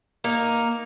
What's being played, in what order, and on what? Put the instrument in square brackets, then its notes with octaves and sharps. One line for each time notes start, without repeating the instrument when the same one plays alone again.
[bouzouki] A#3 D#4 A#4